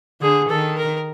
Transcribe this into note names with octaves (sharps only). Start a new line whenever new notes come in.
D3 G#4
D#3 A4
A#4